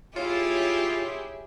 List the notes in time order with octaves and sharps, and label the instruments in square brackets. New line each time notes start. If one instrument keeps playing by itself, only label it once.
[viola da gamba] E4 G4 G#4 [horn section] F4 [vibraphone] C#5